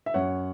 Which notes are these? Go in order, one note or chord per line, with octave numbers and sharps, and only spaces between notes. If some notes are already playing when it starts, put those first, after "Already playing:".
E5
F#2 C#5 F#5